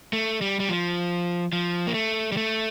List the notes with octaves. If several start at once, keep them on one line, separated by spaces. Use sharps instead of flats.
A3
G3
G3
F3
F3
A#3
A3
G3
A3